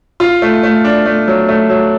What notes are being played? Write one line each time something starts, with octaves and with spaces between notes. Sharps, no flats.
F4
A3
A3
D4
A3
F#3
A3
F#3